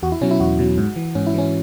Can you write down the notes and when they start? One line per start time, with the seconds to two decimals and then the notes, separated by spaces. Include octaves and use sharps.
0.03 E2 F#4
0.12 E4
0.21 B2 F#3 C#4
0.31 E4
0.40 E2 F#4
0.59 B2 F#3
0.78 G#2
0.96 E3
1.15 G#2 C#4
1.26 E4
1.34 E3 C#4